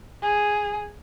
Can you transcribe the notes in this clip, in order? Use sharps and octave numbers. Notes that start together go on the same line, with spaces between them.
G#4